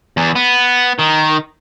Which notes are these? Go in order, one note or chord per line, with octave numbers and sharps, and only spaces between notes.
E2
B3
D#3